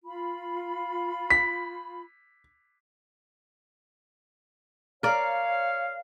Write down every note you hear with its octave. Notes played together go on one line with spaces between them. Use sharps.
F4 B5
B6
A#4 C#5 D5 F5